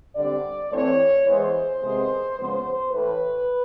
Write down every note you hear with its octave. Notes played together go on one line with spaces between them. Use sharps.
D3 G3 C4 D5
A2 E3 A3 C4 C#5
E3 G#3 B3 C5
C3 D#3 G#3 B3
C#3 F3 G#3 B3 C5
A2 E3 A3 B4